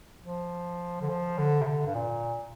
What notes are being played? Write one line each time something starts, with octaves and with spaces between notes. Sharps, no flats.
F3
D3
F3
D3
C3
D3
G2
A#2